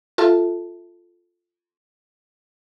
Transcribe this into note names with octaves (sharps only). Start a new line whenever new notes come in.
F4 A4 E5 A5